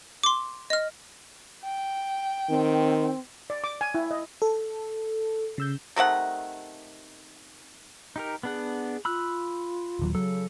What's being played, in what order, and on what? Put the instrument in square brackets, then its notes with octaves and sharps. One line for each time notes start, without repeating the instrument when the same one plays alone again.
[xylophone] C6 D6
D#5 F6
[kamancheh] G5
[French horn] D#3 [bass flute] C4
[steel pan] D5
D6
G#5
E4
D#5
[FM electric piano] A4
C#3 E6 G6
[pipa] C3 D#3 A3 F#5
[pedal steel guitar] D#4 G4 A#4
[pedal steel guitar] B3 D4 F#5 [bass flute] G#4
[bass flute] F4 [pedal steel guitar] B5 E6 F#6
[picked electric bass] D#1 D#2 F#3
[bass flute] C#3 [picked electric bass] F#3 [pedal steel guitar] A4